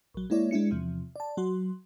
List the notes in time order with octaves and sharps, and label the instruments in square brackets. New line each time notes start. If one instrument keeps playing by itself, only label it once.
[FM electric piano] A#1 F#3
G#3 A#3 E4 C#5 D5
G#3 D4 E4 C#7
E2 C3 F3
D5 A5
F#3 F#4 C6